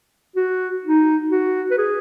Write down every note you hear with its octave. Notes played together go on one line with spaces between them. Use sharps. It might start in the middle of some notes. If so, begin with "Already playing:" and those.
F#4
D#4
F#4
B4
G#4